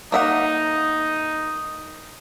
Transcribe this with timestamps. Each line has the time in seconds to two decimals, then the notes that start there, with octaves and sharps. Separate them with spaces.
0.12 A#3 D#4 E5 F#5